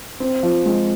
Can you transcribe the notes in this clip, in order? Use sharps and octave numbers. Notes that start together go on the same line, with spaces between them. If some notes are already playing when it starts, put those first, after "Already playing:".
C4
F3
G#3